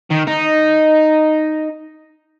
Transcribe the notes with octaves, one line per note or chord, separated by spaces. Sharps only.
D#3
D#4